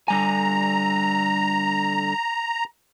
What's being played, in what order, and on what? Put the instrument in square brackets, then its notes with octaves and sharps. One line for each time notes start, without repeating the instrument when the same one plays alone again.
[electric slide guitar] D3 G3 G#5 [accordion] A#5